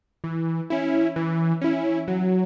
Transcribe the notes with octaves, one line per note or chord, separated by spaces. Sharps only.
E3
C#4 E4
E3
C#4 E4
F#3